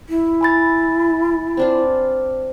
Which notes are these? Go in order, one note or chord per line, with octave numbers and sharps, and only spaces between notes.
E4
G#5 B5 A6
C4 D4 F4